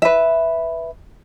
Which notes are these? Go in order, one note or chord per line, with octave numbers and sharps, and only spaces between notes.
B4 E5